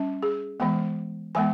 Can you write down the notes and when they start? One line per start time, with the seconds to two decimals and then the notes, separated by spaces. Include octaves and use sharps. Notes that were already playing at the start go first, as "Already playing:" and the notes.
Already playing: G3 C#4
0.23 G#4
0.60 E3 G#3 B3 G5
1.35 E3 G#3 B3 G#5